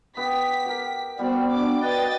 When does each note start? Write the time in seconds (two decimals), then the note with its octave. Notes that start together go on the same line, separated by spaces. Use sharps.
0.17 B3 G4 F#5 B6
0.66 G4 A#4
1.19 G3 B3 C4 F#4 G4 D5
1.53 D4 D6
1.83 B4 D5 D#5 G5 A6